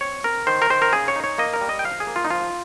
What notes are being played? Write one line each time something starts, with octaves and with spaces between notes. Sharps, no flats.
C4 C#5
C4 A#4
D#3 C5
A#4
D#3 C5
A#4
C#3 G#4
C#5
D#4
C#5
A#3 D#5
A#4
G3
D#5
G5
F3 F5
G#4
A#3
F4
D#4
F3 F4